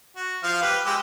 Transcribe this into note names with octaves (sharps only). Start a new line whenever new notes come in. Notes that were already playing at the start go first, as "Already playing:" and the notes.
F#4
F3 F5 F6
G4 B4
G#3 G4 E6